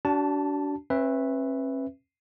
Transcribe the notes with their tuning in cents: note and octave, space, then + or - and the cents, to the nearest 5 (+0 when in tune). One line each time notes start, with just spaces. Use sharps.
D4 -30 F#4 +35 A5 +0
C#4 -45 B4 +0 E5 +0